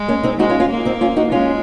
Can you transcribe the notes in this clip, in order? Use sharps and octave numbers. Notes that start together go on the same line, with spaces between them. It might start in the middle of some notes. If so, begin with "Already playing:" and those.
Already playing: G#3
A#3 C#4
C4 D#4
G#3 D#4 F#4
C#4 F4
C#4 F4
A#3
C4 D#4
C#4 F4
D#4 F#4
G#3 C#4 F4